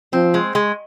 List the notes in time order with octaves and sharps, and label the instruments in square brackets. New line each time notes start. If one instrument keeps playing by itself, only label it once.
[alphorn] F3 [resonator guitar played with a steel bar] C4
[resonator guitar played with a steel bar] G#3
G#3